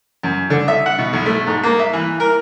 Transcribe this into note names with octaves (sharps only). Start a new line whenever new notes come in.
F#2
D3
E5
F#5
B2
B1
A3
G#2
A#3
E5
E3
A#4